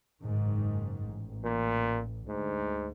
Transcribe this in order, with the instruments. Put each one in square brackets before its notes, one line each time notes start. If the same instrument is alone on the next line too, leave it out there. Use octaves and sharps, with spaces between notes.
[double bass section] F#1 G#2 D#3
A1
[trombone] A#2
[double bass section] D2 [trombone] G#2